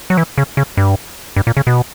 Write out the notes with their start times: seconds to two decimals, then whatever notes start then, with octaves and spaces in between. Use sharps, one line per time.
0.10 F#3
0.17 E3
0.38 C#3
0.57 C#3
0.77 G2
1.36 G2
1.47 A#2
1.57 C#3
1.67 B2